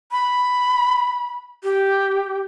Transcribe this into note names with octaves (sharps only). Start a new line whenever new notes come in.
B5
G4